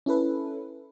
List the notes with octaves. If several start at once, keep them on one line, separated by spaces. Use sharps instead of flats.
C#4 E4 A4 B4